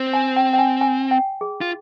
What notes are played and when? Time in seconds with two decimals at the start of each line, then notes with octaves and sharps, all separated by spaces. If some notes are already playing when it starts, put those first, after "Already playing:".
Already playing: C4
0.13 G#5
0.36 G5
0.53 G5
0.58 G#5
0.81 G#5
1.11 G5
1.41 G#4
1.61 F4